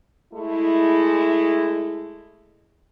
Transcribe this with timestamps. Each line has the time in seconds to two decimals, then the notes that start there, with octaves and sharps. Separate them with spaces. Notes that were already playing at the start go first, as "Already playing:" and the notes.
0.33 G#3 A3 E4